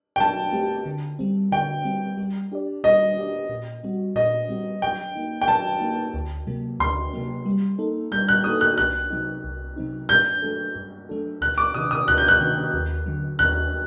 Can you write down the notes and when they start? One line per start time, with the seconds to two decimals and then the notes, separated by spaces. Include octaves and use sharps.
0.16 G5
0.20 F#3 A5
0.53 A3 C4 G4
0.86 D3
1.19 G3 C4
1.52 D3 G5
1.85 G3 C4
2.17 G3
2.52 D4 G4 D5
2.84 G3 D#5
3.17 D4 G4 D5
3.49 A#2
3.84 G3 C4 F#4
4.16 A#2 D#5
4.49 G3 C4 F#4
4.82 F#3 G5
5.15 A#3 D#4
5.41 G5
5.48 F#3 A5
5.80 A#3 D#4
6.14 D2
6.47 C3 F#3 A#3
6.80 D2 C6
7.13 C3 F#3 A#3
7.46 G3
7.78 A#3 D#4 A4
8.12 G3 G6
8.28 F#6
8.44 A#3 D#4 A4 D#6
8.61 F#6
8.78 C2 F#6
9.10 C3 F#3 C4 D#4
9.44 C2
9.76 C3 F#3 C4 D#4
10.09 G2 G6
10.42 F#3 A3 D4 A4
10.75 G2
11.09 F#3 A3 D4 A4
11.41 D2 F#6
11.58 D6
11.74 C3 D#3 D#6
11.91 D#6
12.08 D2 F#6
12.18 G6
12.28 F#6
12.41 C3 D#3
12.74 D#2
13.06 D3 F#3
13.39 D#2 F#6